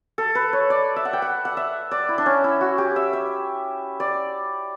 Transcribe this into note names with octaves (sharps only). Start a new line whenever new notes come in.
A4
B4
C#5
D5
E5
F#5
G5
F#5
F#5
E5
D5
E4
D4
C#4
E4
F#4
G4
E5
E5
D5